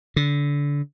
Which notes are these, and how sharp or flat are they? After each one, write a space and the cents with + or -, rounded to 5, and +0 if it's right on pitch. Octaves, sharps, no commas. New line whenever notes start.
D3 -25